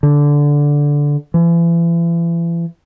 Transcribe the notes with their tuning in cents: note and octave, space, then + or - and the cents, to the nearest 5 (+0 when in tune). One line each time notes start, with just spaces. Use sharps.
D3 -10
E3 +40